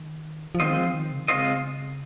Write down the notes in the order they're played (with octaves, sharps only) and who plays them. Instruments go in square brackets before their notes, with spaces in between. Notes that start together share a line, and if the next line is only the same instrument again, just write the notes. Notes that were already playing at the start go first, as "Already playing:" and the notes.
Already playing: [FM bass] D#3
F3
[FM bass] D#3 [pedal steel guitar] G#3 C4 F4 C5 D#5
[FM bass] F3
D#3
C#3
D#3
[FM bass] C#3 [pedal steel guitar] G#3 C4 F4 C5 D#5